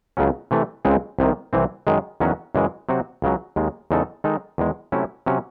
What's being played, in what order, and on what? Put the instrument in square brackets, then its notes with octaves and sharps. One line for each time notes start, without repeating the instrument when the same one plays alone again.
[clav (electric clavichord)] C#2 C#3 F#3 C#4
C3 E3 A3
C#2 C#3 G#3 C4
C2 C3 D#3
C2 C3 E3 C4
F#2 D#3 G#3
E2 D#3 F#3 C#4 F#4
F#2 C#3 E3 G#3
C3 F#3 C4 F#4
C#2 C#3 F#3
D#2 D#3 G#3
E2 C#3 G#3 D#4 A4
D#3 G#3 D#4 A4
E2 D#3 G#3
C3 F#3 A3 C#4 E4
C3 F#3 C#4